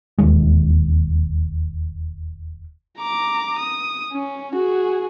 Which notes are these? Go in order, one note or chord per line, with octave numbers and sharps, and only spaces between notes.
E1 D#2 G#3
A#5 D6
D#6
C#4
F#4 G#4